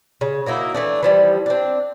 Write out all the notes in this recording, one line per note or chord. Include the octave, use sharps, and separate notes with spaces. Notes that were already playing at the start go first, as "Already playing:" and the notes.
C#3
F#3 A#3 D#4 E4
E3 A3 D4
E3 F3 G3
C4 D4